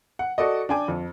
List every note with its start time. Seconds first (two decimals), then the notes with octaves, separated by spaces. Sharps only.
0.19 F#5
0.38 F#4 A4 D5 D#5
0.69 D4 G5 G#5 D6
0.88 F2